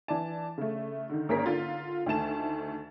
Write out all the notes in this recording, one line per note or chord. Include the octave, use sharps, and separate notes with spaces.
E3 D5 A5
C#3 A3
D3 D#3
G#1 A#3 C#4 G#4 A#4 B6
D3 F4 A6
D2 D#3 A3 A5 E7